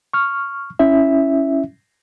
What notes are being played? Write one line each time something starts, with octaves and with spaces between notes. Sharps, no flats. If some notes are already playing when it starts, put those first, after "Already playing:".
C#6 F6
C#4 E4 E5